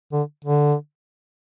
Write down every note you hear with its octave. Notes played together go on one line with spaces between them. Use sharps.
D3
D3